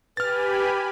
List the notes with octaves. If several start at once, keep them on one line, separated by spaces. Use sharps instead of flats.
G4 B4 G#5 B5 F6 A6